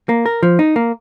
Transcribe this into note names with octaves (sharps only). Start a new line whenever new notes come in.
A#3
A#4
F3
D#4
A#3